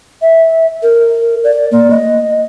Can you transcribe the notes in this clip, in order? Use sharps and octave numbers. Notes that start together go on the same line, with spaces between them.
E5
A#4
D5
A#3
D#5